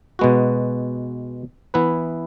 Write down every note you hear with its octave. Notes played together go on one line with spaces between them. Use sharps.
B2 G#3 B3 F#4
E3 B3 E4 B4